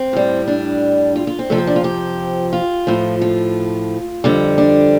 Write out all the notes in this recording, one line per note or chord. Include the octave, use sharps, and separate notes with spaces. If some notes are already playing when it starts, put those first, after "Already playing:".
Already playing: C4
A2 G3
D4
F4
F4
C4
F2 C3 F3 A3
C4
D4
F4
G4
F4
A2 F3
F4
F2 D3 G3
D4